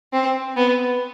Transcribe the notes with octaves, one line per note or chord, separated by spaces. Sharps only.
C4
B3